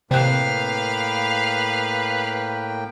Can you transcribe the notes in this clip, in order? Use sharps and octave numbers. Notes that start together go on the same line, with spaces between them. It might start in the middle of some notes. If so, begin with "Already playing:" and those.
A2 C3 A#3 B4 F5 G5 F#6